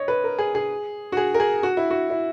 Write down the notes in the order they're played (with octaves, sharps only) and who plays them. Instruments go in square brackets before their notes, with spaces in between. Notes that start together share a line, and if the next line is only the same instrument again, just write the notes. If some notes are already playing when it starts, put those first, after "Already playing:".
Already playing: [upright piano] C#5 D#5
B4
A#4
G#4
G#4
F#4
G#4
A#4
G#4
F#4
E4
F#4
E4